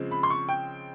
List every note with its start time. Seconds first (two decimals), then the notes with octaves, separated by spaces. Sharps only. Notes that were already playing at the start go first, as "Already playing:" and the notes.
Already playing: C#3 F3 G#3 C4
0.11 B5
0.23 C6
0.30 C#6
0.49 G5